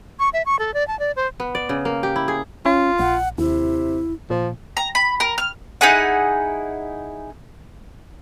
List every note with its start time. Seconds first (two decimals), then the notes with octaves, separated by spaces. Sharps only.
0.19 C#6
0.33 E5
0.46 C#6
0.59 A4
0.74 D5
0.88 A5
0.99 D5
1.16 C5
1.40 B3
1.55 D5
1.69 C#3
1.85 A#3
2.03 G4
2.16 E4
2.28 G#4
2.66 C#4 F4
2.99 A#1 F#5
3.38 D#2 C3 E4
4.30 A#2 F3
4.77 A#5
4.95 B5
5.20 A#4
5.38 F6
5.81 D#4 E4 G#4 F#5